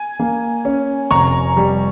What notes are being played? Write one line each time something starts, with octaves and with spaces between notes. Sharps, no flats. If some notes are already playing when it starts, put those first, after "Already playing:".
Already playing: G#5
A#3
C#4
F1 A#5 C#6
G3